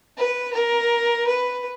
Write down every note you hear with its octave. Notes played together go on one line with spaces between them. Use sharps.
B4
A#4
B4